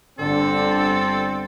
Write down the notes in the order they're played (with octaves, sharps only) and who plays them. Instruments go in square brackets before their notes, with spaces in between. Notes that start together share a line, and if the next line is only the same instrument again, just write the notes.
[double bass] G1 D4 [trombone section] D3 [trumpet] C4 [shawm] A4